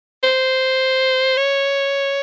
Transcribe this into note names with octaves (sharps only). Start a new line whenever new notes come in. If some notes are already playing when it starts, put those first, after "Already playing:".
C5
C#5